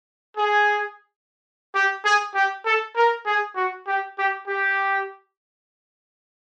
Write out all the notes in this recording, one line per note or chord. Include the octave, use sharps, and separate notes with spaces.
G#4
G4
G#4
G4
A4
A#4
G#4
F#4
G4
G4
G4